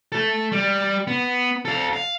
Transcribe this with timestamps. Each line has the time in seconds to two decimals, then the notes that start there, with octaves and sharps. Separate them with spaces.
0.12 A3 A4
0.52 G3
1.07 B3
1.65 A4 F5
1.93 F5